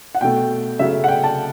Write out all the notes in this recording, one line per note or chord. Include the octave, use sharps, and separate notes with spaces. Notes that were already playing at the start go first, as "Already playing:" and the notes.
F#5
B2 A3 G5
C#3 F#3 A3 E5
F#5
G5
A5